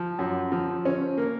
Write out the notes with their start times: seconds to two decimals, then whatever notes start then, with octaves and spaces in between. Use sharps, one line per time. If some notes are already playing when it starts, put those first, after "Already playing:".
Already playing: F3
0.19 F#2
0.52 F3
0.85 C#4
1.18 A#3